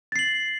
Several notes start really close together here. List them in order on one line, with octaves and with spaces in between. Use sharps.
A6 C7 F#7